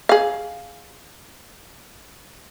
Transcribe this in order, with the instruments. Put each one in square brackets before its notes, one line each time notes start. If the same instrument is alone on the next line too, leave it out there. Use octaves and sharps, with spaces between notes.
[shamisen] G#4 F5